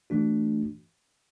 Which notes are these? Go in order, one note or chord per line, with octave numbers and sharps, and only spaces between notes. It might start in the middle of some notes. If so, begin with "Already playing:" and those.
E3 A3 D4 F#4